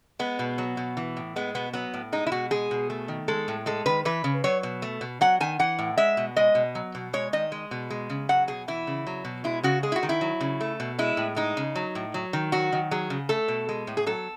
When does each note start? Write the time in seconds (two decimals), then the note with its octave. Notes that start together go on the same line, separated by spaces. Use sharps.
0.19 G#3 B3
0.39 B2
0.58 F#3
0.77 B2
0.97 E3
1.17 A2
1.36 G#3 B3
1.55 B2 B3
1.73 F#3 B3
1.94 A2
2.12 G#3 D#4
2.26 E4
2.32 B2 F#4
2.51 G#3 G#4
2.71 B2
2.90 A3
3.08 D#3
3.28 G#3 A4
3.48 A2
3.66 G#3 A4
3.86 D#3 B4
4.05 E3 B4
4.24 C#3
4.44 F#3 C#5
4.63 B2
4.82 A3
5.01 B2
5.21 F#3 F#5
5.40 D#3 G#5
5.59 E3 F#5
5.79 A2
5.97 G#3 E5
6.17 B2
6.36 G#3 D#5
6.55 B2
6.75 F#3
6.95 B2
7.13 G#3 C#5
7.33 D#3 D#5
7.52 G#3
7.71 B2
7.90 G#3
8.10 C#3
8.29 F#3 F#5
8.48 B2 G#4
8.68 E3 E4
8.87 C#3
9.07 F#3
9.25 B2
9.44 G#3 E4
9.63 C#3 F#4
9.83 G#3 G#4
9.92 E4
9.96 F#4
10.03 D#3
10.09 E4
10.21 F#3
10.41 C#3
10.61 A3
10.80 B2
10.99 G#3 E4
11.17 A2
11.36 G#3 D#4
11.57 C#3
11.75 F#3
11.95 A2
12.14 F#3
12.33 D#3
12.52 F#3 F#4
12.72 D#3
12.91 F#3 G#4
13.10 C#3
13.29 A3 A4
13.48 B2
13.69 G#3
13.87 A2
13.97 G#4
14.06 F#3 A4